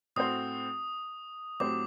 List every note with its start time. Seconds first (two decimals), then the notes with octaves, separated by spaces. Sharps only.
0.16 A2 A3 C4 F#4 C5 D#6
1.60 A2 F#3 C4 G4 C5 D6